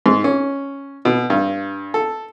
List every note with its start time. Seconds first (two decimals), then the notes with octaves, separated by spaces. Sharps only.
0.06 G#2
0.24 C#4
1.05 B2
1.30 G2
1.94 A4